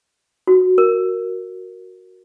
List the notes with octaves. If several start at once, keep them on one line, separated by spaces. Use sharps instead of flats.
F#4
A#4